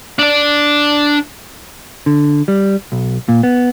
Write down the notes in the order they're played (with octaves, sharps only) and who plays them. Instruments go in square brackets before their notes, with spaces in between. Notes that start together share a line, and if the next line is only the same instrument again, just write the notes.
[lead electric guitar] D4 D5
[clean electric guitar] D3
G3
B1
A#2
B3